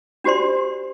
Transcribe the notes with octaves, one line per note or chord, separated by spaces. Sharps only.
D4 F#4 G4 C5 D5 C6